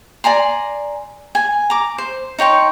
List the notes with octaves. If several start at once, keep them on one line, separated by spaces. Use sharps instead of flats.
D5 G#5 A#5 C6
G#5
A#5 D6
C5
D#4 C#5 G5 C6